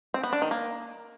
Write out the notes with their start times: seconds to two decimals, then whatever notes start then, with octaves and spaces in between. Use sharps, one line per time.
0.14 C4
0.24 B3
0.33 D4
0.42 D#3
0.51 A#3